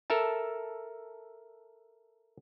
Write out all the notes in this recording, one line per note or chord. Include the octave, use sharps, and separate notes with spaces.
A4 A#4 E5 A5